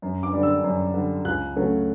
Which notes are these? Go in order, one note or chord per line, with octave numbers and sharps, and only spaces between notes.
F#2
D6
D3 G3
E6
F#2
D3 G3
C#2 F#6
C#3 F#3 A3 C#4